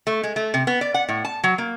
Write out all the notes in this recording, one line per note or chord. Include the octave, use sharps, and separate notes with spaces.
A3
G#3
A3
C3
B3
D5
F#5
A2
A5
F#3
A#3